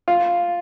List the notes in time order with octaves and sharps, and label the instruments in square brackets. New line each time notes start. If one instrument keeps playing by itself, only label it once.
[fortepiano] F4